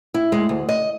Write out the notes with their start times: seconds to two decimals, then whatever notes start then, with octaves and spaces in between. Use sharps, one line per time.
0.14 E4
0.32 G#3
0.49 D2
0.69 D#5